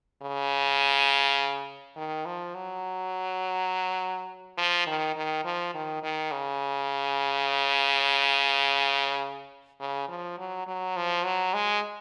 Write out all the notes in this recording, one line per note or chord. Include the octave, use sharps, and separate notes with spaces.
C#3
D#3
F3
F#3
F3
D#3
D#3
F3
D#3
D#3
C#3
C#3
F3
F#3
F#3
F3
F#3
G#3